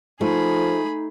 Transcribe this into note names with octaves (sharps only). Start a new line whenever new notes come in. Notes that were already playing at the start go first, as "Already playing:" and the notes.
F3 A3 D#4 G#4 B5